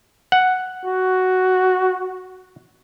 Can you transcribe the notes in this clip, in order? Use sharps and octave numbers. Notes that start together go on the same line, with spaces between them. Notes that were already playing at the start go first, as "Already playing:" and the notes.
F#5
F#4